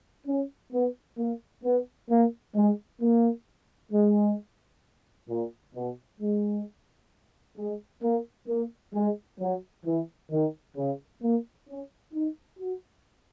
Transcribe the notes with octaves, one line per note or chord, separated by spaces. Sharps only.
C#4
B3
A#3
B3
A#3
G#3
A#3
G#3
A#2
B2
G#3
G#3
A#3
A#3
G#3
F#3
E3
D#3
C#3
A#3
C#4
D#4
F#4